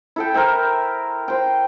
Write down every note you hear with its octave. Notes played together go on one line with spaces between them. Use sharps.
E4 A4 G5
A#4 C5 E5 G5
C5 G5